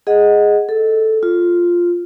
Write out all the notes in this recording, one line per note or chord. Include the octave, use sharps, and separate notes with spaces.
G#4 D#5 F#5
A4
F4